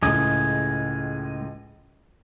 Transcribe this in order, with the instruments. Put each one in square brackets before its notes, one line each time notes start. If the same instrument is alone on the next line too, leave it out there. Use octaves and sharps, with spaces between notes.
[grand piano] C#2 A2 [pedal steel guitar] G#3 D#6